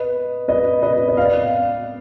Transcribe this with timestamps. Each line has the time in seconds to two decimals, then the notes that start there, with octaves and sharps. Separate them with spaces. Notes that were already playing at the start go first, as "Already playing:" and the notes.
Already playing: B4 D#5
0.48 B4 D#5
0.82 B4 D#5
1.09 D#5
1.17 D5 F5